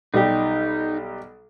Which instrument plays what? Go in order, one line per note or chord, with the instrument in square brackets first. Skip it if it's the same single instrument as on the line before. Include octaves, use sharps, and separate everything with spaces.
[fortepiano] B1 G3 G4 [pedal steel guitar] D#4